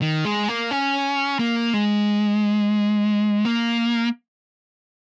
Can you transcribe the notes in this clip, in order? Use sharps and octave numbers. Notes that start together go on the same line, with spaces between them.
D#3
G#3
A#3
C#4
A#3
G#3
A#3